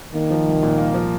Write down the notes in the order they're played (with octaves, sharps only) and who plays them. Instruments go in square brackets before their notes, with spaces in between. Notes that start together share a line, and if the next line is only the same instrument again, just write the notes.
[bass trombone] D#3 [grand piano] A#3
[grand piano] F3
C2
A#2
A#3
F3